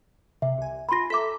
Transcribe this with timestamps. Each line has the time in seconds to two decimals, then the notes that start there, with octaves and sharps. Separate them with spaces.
0.42 C3 E5
0.58 C2 G#5
0.89 F4 G#5 B5 C6 A#6
1.10 A4 E5 A#5 D6 B6